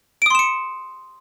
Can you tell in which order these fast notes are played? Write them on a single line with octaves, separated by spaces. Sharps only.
D7 D#6 C6 E7 C#7